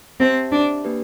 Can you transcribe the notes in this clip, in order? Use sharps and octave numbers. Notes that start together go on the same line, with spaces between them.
C4 G4 C5 E5 A5
D4
A#3 D4 G4 B4